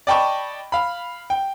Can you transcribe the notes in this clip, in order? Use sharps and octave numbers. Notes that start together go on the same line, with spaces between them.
D5 D#5 G5 A5 B5 C#6
F5 B5
G5